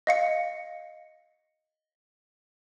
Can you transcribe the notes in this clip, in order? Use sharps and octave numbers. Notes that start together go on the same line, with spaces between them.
D#5 F5 C#7